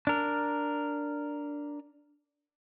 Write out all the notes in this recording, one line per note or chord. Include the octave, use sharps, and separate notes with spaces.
D4 A#4